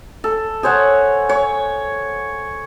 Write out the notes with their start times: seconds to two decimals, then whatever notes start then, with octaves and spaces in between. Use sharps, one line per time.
0.24 A4
0.63 G#4 C5 C#5 F#5
1.29 C#5